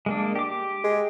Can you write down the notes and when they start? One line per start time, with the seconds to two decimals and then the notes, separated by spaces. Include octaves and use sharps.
0.06 G#3 A#3 D4
0.36 G4 D6
0.84 G#3